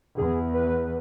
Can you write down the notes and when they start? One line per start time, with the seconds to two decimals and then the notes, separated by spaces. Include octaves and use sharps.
0.18 E2 G#4
0.54 B4